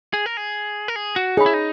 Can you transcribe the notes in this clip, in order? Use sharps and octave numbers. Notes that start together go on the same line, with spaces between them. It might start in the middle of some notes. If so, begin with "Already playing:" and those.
G#4
A#4
G#4
A#4
G#4
F#4
D#4 G#4 C#5 G#5 B5
E4
D#4